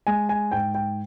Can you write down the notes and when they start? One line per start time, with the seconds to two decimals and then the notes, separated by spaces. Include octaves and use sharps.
0.07 G#3 G#5
0.29 G#5
0.52 G#2 G5
0.75 G5